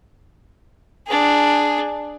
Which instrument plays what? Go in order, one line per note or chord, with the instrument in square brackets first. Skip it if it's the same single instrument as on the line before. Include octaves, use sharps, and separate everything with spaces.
[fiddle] D4 G#4